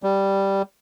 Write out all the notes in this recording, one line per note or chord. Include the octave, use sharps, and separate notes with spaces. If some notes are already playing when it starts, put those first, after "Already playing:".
G3